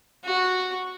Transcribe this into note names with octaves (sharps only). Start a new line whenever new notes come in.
F#4